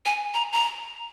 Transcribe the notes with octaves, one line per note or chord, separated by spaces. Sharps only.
G#5
A#5
A#5